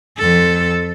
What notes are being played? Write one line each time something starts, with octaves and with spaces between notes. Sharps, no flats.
F2 A4